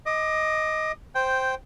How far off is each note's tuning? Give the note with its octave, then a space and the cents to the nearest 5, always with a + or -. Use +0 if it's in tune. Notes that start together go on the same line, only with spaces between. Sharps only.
D#5 +10 D6 +25
C5 +0 G5 -5